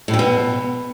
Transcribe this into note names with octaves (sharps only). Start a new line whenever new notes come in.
A2
F2
B2